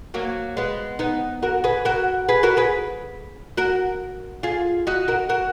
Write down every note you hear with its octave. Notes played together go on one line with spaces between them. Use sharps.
F#3 A#3
G#3 B3
B3 D#4
F#4 A#4
G#4 B4
F#4 A#4
G#4 B4
F#4 A#4
G#4 B4
F#4 A#4
F4 G#4
D#4 F#4
F#4 A#4
F#4 A#4